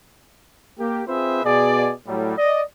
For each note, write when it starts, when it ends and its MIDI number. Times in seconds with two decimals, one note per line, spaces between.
0.79 1.02 58
0.79 1.02 67
1.08 1.41 60
1.08 1.41 65
1.08 1.41 68
1.08 1.41 71
1.08 1.41 72
1.08 1.41 76
1.44 1.92 47
1.44 1.92 68
1.44 1.92 74
2.07 2.33 45
2.07 2.33 54
2.07 2.33 55
2.37 2.62 74
2.37 2.62 75